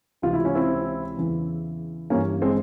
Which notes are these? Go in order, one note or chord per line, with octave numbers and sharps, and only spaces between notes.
C#2 C3 E3 F4
E4
C#4
C4 E4
E2 C#3 E3
G2 E3 A#3 C#4
G#3 C4